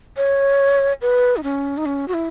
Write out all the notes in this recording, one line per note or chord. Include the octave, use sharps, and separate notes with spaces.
C#5
B4
D#4
C#4
D#4
C#4
F#4
E4